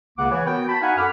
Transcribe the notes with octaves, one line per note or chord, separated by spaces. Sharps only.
C#2 C#3 A#3 F#5 D6
E3 C#5
B3 F#4 A#4 G5
A5 B5
D#4 F#4 F5 F#5 G#5
F#2 A4 F#5 B5 D6 F6